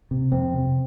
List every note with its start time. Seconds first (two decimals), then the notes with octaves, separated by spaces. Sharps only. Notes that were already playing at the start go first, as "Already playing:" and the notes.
0.11 C3
0.32 F2 C4
0.54 C3